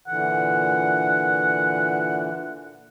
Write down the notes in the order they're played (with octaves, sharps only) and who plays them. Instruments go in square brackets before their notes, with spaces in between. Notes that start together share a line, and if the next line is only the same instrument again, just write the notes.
[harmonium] A#2 D3 E3 [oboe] F#5